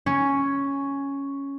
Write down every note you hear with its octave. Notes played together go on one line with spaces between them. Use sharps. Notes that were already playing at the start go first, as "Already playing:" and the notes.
C#4